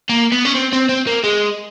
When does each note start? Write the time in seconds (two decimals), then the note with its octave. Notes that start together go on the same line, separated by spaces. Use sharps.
0.09 A#3
0.32 B3
0.45 C#4
0.55 C4
0.73 C4
0.89 C4
1.07 A#3
1.24 G#3